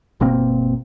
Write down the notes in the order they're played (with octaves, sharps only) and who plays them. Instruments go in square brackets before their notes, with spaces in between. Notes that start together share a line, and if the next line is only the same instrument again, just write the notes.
[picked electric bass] G1 B2 A#3 C4